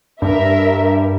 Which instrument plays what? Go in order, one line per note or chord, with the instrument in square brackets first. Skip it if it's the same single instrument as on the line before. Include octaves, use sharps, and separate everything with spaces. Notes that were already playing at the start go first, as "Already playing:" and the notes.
[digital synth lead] G2 [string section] A#4 E5